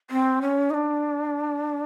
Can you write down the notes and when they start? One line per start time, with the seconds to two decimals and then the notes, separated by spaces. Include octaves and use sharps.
0.10 C4
0.41 C#4
0.70 D#4
0.74 D4